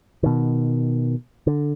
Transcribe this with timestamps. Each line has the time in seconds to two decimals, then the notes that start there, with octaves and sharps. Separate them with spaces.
0.23 B2 D#3
1.47 D3